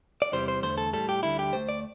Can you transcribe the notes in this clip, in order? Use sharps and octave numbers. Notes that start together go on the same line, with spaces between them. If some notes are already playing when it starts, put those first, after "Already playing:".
D5
E2 C3 E3 G3 C5
C5
E2 D3 A3 C5
A4
A2 G3 A4
G4
D2 D3 G3 E4
G4
D2 C3 A3 C5
D5